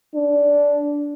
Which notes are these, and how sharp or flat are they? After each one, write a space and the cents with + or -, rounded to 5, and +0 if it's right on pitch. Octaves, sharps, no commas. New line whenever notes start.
D4 -15